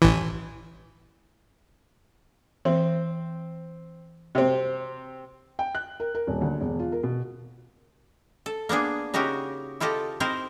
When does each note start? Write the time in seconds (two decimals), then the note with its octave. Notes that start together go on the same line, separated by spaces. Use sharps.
0.02 A1 E3
2.65 E3 C4
4.35 C3 C4 F#4
5.59 G5
5.75 F#6
6.00 A#4
6.15 A#4
6.27 D#1
6.41 D2
6.61 E1
6.79 F4
6.92 A#4
7.04 B2
8.46 A4
8.69 A#3 B3 D4 G#4
9.14 C#3 D#4 F#4 G4 A#4
9.80 E4 F4 G4 A4 D#5
10.20 C4 D#4 E4 A#4 C5